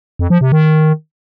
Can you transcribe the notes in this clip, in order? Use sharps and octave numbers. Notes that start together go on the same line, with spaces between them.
F2
F3
C3
D#3